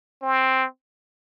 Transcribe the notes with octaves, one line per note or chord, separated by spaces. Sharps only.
C4